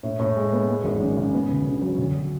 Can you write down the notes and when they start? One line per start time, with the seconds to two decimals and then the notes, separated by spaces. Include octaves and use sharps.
0.03 A2
0.19 A2
0.36 G#3
0.53 B3
0.69 G#3
0.84 G#1
1.00 F#2
1.17 C#3
1.34 B3
1.49 D2
1.65 D3
1.82 F#3
1.99 D2